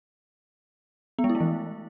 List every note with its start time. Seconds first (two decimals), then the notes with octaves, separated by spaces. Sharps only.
1.19 B3
1.24 G#3
1.30 E4
1.35 A3
1.40 E3